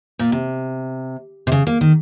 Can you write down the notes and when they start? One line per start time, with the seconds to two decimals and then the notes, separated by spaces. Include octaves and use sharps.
0.19 A#2
0.32 C3
1.47 C3
1.52 C#3
1.67 A#3
1.81 D#3